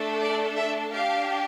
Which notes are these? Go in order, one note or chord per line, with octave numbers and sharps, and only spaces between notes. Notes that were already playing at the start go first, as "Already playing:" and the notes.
Already playing: A3 D4 A4
D5
E5
D4 G4 F5